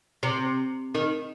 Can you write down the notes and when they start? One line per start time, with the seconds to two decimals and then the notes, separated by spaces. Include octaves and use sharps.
0.23 C3
0.95 D#3